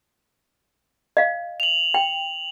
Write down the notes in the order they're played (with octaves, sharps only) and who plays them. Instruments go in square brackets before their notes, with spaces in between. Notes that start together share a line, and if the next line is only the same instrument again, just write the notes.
[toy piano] D#5 F5
[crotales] F7 F#7
[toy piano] G5